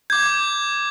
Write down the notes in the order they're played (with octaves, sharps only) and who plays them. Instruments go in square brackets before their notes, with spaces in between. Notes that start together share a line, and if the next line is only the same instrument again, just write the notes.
[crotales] D6 G6 G#6